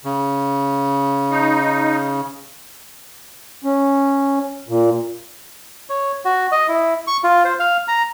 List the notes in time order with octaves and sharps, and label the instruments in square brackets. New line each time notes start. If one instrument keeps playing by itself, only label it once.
[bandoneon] C#3
[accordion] D#4
C#4
A#2
[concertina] C#5
F#4
D#5
E4
C#6
F4
C5
F5
A#5